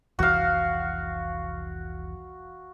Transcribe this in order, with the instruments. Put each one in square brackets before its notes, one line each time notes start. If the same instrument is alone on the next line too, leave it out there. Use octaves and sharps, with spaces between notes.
[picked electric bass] F1 C2 E3 [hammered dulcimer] F#4 F5